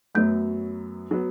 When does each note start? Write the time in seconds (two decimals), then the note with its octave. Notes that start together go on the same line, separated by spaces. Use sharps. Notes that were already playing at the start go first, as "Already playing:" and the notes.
0.15 F#2 F#3 A3 B3
1.11 F#3 B3